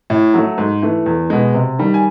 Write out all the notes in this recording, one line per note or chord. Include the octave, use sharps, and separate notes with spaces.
A2
F#3 A3
G#2
E3 A3
E2
B2 G#3
C3
D#3 G3
G#5